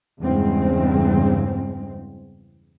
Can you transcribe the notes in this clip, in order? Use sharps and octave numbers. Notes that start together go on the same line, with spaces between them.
E2 G2 C#3 G#3 C4